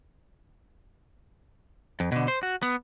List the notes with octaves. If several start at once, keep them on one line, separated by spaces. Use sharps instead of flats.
F2
B2 D3
C5
F#4
B3